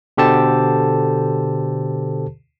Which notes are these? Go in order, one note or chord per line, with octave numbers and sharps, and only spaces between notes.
B2 D3 G4 A4 C5 A5